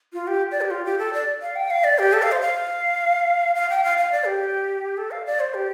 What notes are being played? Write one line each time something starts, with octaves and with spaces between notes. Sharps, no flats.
F4
G4
D5
G4
F4
G4
A4
D5
F5
G5
F5
D5
G4
A4
F5
C5
F5
F5
G5
F5
F5
D5
G4
A4
F5
D5
C5
G4